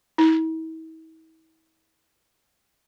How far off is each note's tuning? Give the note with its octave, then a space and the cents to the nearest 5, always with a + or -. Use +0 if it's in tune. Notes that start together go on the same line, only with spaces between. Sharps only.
E4 -45